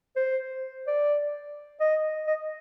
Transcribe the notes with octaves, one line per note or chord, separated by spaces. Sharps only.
C5
D5
D#5
D#5